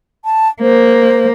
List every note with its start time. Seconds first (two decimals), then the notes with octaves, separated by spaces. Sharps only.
0.25 A5
0.62 A#3 C5